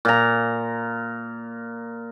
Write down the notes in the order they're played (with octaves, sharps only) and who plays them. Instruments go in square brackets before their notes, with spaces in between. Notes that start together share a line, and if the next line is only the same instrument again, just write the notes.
[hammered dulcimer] A#2 A#5